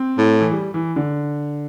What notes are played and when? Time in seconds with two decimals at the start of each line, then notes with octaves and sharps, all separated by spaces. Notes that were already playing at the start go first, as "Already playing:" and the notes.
Already playing: C4
0.18 A2
0.41 E3
0.52 G3
0.74 E3
0.96 D3